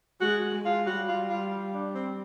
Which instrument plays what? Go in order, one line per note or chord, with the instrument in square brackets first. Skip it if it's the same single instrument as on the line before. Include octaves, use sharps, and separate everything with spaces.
[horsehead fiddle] G#3 [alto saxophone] F#4
[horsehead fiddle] G#3
[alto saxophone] F4
[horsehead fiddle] G3 [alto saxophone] F#4
[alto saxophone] F4
F4
D4
C4